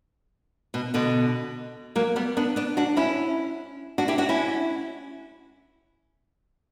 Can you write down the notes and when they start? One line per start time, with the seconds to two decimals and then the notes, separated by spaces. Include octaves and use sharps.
0.74 B2
0.94 B2 D3
1.96 F#3 A#3
2.16 G3 B3
2.37 B3 D4
2.56 B3 D4
2.77 D4 F#4
2.97 C#4 E4
3.98 D4 F#4
4.08 E4 G4
4.18 D4 F#4
4.29 C#4 E4